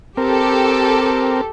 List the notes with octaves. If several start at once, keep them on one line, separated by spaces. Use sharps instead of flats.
C4 G4 A4 A#4